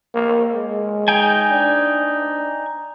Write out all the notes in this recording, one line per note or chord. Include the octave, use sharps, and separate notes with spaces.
A#3
G#3
D#4 G5 G#5
D4